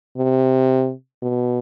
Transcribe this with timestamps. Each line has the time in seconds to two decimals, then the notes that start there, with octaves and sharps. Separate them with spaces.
0.17 C3
1.23 B2